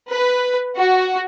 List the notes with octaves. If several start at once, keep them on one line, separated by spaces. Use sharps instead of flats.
B4
F#4